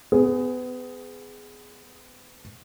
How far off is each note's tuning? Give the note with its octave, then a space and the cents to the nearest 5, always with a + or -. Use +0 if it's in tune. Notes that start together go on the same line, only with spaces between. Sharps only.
B3 +30 G#4 +0